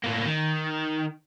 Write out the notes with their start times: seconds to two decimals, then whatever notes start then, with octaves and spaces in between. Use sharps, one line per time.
0.04 A2 A#3
0.25 D#3